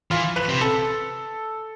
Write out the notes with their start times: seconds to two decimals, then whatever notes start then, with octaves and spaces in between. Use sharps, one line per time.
0.11 E3 F4
0.36 B4
0.49 C3
0.61 A4